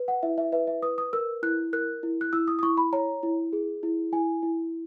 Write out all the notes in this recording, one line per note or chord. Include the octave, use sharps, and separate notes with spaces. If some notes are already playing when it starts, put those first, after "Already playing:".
Already playing: B4
F#5
E4 E5
E5
B4 E5
E5
B4 D#6
D#6
A#4 E6
E4 F#6
A#4 F#6
E4
F#6
E4 E6
D#6
D#6
E4 C#6
B5
C#5 A#5
E4
G#4
E4
E4 G#5
E4